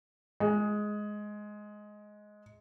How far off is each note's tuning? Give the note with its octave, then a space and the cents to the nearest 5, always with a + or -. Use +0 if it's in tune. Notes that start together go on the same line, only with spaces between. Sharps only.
G#3 +10